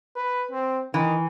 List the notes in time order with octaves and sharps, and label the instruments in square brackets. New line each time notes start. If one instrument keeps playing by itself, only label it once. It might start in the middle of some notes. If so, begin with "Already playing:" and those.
[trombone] B4
C4
[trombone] D#3 [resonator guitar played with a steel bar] E3